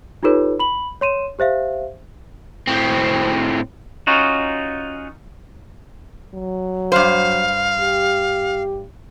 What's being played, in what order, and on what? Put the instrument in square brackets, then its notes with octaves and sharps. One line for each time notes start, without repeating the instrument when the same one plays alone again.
[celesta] D#4 F4 G4 A4 B4 C#5
B5 F#7
C#5 C6 D#7 E7
G4 C5 E5 F5
[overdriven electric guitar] A2 C4
[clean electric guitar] C#4 D#4 F4 F#4
[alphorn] F#3
[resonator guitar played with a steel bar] G2 C5 [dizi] F5
[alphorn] G4